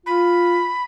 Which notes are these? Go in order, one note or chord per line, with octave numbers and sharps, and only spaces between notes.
F4 B5